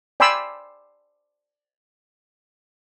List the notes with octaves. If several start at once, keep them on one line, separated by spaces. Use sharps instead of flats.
D5 G5 G#5 B5 C6 E6